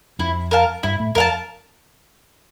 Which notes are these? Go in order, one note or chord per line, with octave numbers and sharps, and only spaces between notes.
F2 F3 E4
A#4 F5 A5
G2 G3 E4
A2 A3
F2 F3 A#4 F5 A5